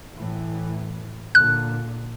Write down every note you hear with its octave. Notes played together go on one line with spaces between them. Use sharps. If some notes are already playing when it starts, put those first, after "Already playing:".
A2 E3
A#2 D3 F#6